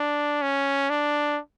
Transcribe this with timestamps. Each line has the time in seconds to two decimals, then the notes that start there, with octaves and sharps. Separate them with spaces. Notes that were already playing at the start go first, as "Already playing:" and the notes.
Already playing: D4
0.42 C#4
0.90 D4